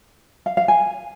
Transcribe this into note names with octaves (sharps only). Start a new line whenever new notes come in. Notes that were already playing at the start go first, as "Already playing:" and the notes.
F5
F5
G#5